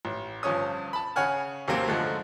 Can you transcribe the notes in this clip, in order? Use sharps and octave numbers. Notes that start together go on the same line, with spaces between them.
A1
G1 G2 F3 C#4 C#5 D#6
A5 B5
C#3 C#4 C#5 F#5 G#5 F6
D#2 C3 F#3 A#3 C4 C#4
F#2 D3 F3 G#3 A3